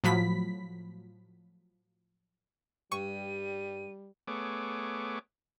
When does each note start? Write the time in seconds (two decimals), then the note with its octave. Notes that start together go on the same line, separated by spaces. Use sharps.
0.04 A2 F3 F#3 B5 B6
2.92 G2 G3 C#6 D#7
4.28 A3 B3 G#4 C#5 D6